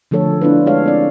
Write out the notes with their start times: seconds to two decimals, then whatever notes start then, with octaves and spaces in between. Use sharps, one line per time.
0.11 D3 F3 A3 A4 C#5
0.41 B3 D4 E4 F4 B4
0.66 G#3 C#4 G#4 A4 C#5 F5
0.86 C4 D5